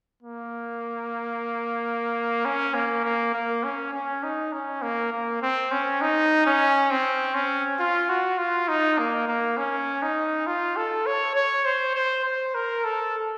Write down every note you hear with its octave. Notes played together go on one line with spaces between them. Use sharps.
A#3
C#4
A#3
A#3
A#3
C#4
C#4
D#4
C#4
A#3
A#3
C4
C#4
D#4
C#4
C4
C#4
F4
F#4
F4
D#4
A#3
A#3
C#4
D#4
F4
A4
C#5
C#5
C5
C5
C5
A#4
A4